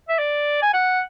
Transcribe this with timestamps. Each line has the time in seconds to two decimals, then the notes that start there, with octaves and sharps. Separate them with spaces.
0.09 E5
0.19 D5
0.62 G#5
0.74 F#5